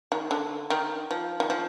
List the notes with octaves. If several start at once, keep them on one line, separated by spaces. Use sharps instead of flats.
D#3
D3
D#3
F3
D#3
F3